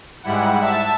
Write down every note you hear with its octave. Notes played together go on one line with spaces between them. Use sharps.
G#2 G3 E4 F#5
E5 A5 E7